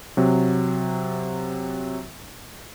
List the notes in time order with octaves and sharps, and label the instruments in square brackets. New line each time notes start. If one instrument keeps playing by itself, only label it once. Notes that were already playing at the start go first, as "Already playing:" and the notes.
[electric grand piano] C3 F#3